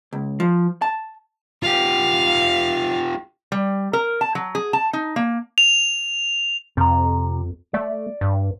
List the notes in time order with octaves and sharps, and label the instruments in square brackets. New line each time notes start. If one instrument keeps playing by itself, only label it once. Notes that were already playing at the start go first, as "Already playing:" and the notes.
[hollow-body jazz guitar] C#2
F3
A5
[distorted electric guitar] F4 G4 [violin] F5
[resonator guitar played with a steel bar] G3
A#4
A5
F#3
G#4
A5
D#4
A#3
[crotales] F7
[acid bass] F2 [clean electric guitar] C3 A#5
[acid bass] A3 [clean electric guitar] D5
[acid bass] G2